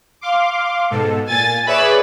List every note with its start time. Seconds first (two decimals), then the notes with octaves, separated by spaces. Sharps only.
0.21 F5 C6 D6
0.90 G#2 B2 A4
1.29 A#2 G#5 A6
1.67 G#4 B4 C#5 D5 E5 B5